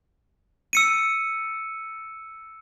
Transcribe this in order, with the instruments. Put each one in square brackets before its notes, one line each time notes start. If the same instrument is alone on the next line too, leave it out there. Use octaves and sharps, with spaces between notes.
[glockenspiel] E6 C#7 D#7